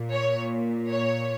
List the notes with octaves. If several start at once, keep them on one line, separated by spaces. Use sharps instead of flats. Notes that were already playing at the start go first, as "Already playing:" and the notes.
Already playing: A#2
C#5
C#5